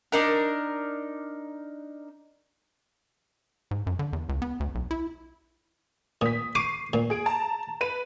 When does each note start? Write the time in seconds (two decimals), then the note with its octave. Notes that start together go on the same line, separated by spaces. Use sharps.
0.12 D4 D#4 A#4
3.71 G#2
3.87 F#2
3.99 D3
4.13 E2
4.29 C#2
4.42 B3
4.60 D2
4.75 B1
4.91 E4
6.21 A#2 D#6 B6
6.55 C#6 D6 C7 D#7
6.93 A#2
7.10 G#4 D7
7.26 A5 A#5
7.81 B4 D#7